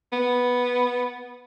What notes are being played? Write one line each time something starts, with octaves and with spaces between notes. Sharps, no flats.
B3